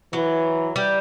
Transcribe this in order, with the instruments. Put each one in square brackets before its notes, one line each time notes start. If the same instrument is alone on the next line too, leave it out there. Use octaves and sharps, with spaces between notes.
[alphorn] E3 [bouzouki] F#3
[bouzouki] G3